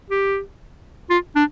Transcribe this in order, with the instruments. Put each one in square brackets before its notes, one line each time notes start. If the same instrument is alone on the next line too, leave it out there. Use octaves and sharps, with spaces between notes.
[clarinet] G4
F4
D4